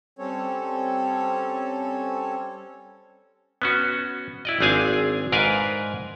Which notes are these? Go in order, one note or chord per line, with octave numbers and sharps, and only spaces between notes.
G3 C4 C#4 A4 C#5
B3 C#4 F#4
E4 D5 D#5
G#1 C4 D4 G#4 F5 G#5
G#2 A#4 B4 D5 F5 G#5